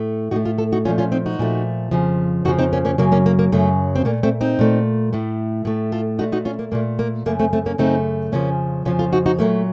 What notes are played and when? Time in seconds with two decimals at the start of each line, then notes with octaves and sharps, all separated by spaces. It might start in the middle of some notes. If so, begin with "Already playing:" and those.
Already playing: A2 A3
0.31 A2 D#4 F#4
0.36 A3
0.45 F4 A4
0.58 F4 A4
0.72 D#4 F#4
0.85 A#2 F3 A3 C#4 F4
0.98 C#4 F4
1.12 C4 D#4
1.26 D#4 F#4
1.39 A#2 F3 A3
1.91 F2 C#3 F3
2.45 F2 C#3 F3 D#4 F#4
2.59 C4 D#4
2.73 A#3 C#4
2.85 A#3 C#4
2.98 F#2 C#3 F#3 A#3
3.12 A#3 C#4
3.26 A#3
3.39 A#3
3.52 F#2 C#3 F#3 A3
3.96 C4
4.05 A#2 A3 A#3
4.23 A3 C4
4.41 C4 D#4
4.59 A#2 A3
5.13 A2 A3
5.65 A2 A3
5.92 F4 A4
6.19 A#2 A3 D#4 F#4
6.32 D#4 F#4
6.45 C#4 F4
6.59 A#3
6.72 A#2 A3 A#3
6.99 A#3
7.26 F#2 C#3 A3 A#3
7.40 A3 C4
7.53 A3 C4
7.66 A#3 C#4
7.78 F#2 C#3 A3 C4 D#4
8.32 F2 C#3 F3 A#3 C#4
8.85 F2 C#3 F3 C#4 F4
8.99 F4 A4
9.12 D#4 F#4
9.26 D#4 F#4
9.39 A#2 F#3 A3 A#3